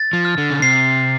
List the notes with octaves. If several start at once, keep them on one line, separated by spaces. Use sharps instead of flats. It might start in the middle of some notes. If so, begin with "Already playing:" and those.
Already playing: A6
F3
F6
D3
C#3
C3 C7